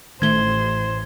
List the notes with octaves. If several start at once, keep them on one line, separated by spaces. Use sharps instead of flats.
A1 A2 D#3 A3 C5 G#6 G7